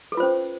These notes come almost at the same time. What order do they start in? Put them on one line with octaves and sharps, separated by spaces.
A4 B4 F4 C5 C#4